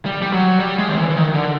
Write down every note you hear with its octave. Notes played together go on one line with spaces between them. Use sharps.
G3
G3
F#3
G3
G#3
D#3
E3
E3
D#3
D3